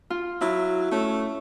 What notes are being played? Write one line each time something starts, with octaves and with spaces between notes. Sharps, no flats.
F4
F#3 E4
A3 C#4